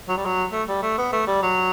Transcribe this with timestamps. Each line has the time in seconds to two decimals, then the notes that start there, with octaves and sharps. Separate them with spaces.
0.09 F#3
0.17 G3
0.26 F#3
0.52 A3
0.68 G3
0.83 A3
0.98 B3
1.13 A3
1.27 G3
1.42 F#3